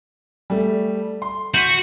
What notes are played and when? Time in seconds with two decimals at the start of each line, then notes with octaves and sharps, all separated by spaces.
0.50 G3 A3
1.22 C6
1.54 F#4 G6 B6 D#7